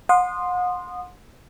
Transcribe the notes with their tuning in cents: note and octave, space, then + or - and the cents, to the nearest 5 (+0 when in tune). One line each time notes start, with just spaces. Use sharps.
F#5 -40 C6 +0 D#6 -20